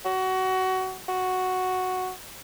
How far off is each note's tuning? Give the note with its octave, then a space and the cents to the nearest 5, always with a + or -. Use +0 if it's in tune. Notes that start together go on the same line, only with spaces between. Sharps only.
F#4 +20
F#4 +0